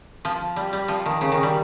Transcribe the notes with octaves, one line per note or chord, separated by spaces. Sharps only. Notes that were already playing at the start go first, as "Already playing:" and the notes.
F3
G3
G3
F3
D#3
C#3
D#3
G3